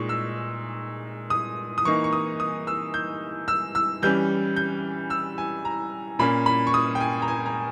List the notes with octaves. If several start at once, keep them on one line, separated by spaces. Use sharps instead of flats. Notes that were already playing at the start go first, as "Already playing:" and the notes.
Already playing: A#2 G#3 D#4 C#6
E6
D#6
D#6
E3 A#3 D#4 C#6
C#6
D#6
D#6
E6
G6
E6
E6
E3 G3 C#4 G6
G6
E6
G#5
A#5
A#2 A#3 C#4 B5
B5
C#6
D#6
G5
G#5
A#5
G#5
A#5